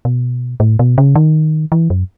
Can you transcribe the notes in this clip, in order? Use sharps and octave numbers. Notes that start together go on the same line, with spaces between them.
B2
A2
B2
C#3
D#3
E3
F#2